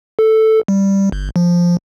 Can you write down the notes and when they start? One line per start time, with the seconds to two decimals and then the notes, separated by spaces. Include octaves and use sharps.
0.19 A4
0.68 G3
1.12 G1
1.36 F3